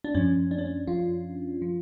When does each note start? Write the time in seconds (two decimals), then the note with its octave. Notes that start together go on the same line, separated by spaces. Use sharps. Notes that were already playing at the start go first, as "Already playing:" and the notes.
0.04 D4
0.15 F#2 F3 C#4
0.51 D4
0.58 C#4
0.65 D4
0.87 F#2 F3 F4
1.62 F3